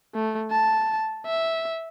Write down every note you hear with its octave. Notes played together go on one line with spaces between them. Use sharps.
A3
A5
E5